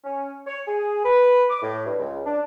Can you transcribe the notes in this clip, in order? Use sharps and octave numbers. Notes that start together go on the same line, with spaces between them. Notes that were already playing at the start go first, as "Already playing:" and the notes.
C#4
C#5
G#4
B4
D6
A2
G2
C#2
D4